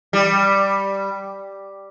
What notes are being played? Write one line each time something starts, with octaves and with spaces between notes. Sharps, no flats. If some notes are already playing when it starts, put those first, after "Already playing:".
G3